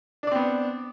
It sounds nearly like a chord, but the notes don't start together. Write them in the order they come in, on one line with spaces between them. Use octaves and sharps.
D4 D5 C4 B3